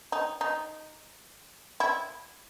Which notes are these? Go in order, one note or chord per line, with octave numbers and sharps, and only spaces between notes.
D#4
D#4
E4